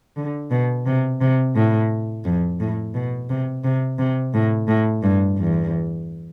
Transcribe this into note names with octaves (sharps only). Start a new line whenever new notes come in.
D3
B2
C3
C3
A2
F2
A2
B2
C3
C3
C3
A2
A2
G2
E2